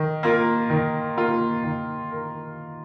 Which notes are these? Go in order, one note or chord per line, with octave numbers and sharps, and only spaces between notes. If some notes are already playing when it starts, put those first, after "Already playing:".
Already playing: D#3
A#3 F4 A#4
D#3
A#3 F4 A#4
D#3
A#4